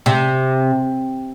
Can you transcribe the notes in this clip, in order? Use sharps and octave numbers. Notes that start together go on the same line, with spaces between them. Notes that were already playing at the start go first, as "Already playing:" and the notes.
C3